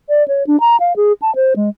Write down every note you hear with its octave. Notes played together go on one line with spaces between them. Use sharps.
D5
C#5
D4
A#5
F5
G#4
A5
C5
G#3